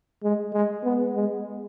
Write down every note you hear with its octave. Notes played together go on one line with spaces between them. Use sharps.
G#3
G#3
B3
G#3